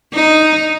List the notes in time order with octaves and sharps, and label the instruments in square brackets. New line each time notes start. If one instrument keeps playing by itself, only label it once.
[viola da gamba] D#4